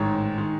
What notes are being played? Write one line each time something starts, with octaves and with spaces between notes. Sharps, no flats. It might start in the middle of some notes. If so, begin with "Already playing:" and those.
Already playing: A1 G#2 D#3 G#3 C#5
D#3 G#3